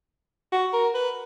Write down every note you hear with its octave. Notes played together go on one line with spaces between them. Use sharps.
F#4
A#4
B4